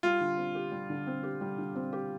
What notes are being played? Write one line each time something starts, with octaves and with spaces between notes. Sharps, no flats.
G3 F4
D3
C4
G4
G3
D3
C4
G4
G3
D3
C4
G4